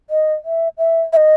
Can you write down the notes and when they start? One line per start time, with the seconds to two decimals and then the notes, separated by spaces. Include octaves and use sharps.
0.10 D#5
0.45 E5
0.78 E5
1.13 E5
1.17 D#5